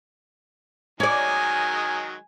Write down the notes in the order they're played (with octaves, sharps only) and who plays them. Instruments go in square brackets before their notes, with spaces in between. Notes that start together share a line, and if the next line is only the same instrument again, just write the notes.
[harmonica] D#3 F#3 G#3 [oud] C#5 D5 [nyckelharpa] G#5